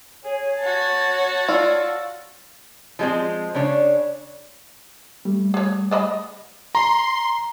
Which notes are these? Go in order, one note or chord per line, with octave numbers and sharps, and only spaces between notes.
G#4 C#5
F#4 A5
F4 D5 E6
F3 G#3 C4
C#3 D4 C#5 D5
G3 A3
G#4 C#5
D5 D#5 B5
A#5 C6